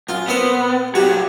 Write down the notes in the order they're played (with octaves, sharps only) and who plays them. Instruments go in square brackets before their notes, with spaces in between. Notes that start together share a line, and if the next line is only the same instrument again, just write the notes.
[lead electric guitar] F#2 [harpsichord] F4
[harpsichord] A#2 C4 C5 [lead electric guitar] B3
[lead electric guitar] C2 F#3 [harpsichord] F#4 [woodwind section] G4